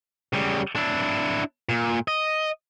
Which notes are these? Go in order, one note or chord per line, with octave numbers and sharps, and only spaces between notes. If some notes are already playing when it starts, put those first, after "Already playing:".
C#3 G3
D4 E4
A#2
D#5